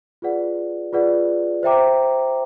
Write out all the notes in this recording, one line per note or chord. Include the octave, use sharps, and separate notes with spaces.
F4 G#4 B4 D5 F#5
F4 G#4 B4 D5 F#5
C5 E5 G5 A#5 D6